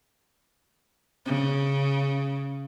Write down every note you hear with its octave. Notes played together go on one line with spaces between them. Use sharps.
C#3